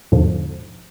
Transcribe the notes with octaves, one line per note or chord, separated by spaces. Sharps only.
E2 G#2 B2 D3 F3